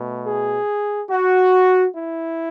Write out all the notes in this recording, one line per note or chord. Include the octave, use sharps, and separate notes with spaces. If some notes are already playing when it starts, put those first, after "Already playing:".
Already playing: B2 A3
G#4
F#4
E4